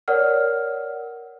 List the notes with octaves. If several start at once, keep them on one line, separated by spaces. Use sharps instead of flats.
A#4 C#5 D5 F#5 F6